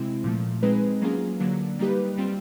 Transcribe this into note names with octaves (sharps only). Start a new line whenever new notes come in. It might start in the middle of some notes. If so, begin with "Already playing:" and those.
Already playing: C3 G#3 C4 E4
A#2 F3 A3
G#3 C4 D#4 G#4 B4
F#3 A#3 C#4 F4 G#4
D3 F#3 A#3 D4
G3 A#3 D#4 G4 B4
G3 C4 F4